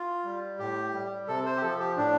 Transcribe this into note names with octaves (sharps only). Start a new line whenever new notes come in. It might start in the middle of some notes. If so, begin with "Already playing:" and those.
Already playing: F4
G3
A2 G4
G3
C3 A4
C5
G4
F3 A4
G4
A2 D4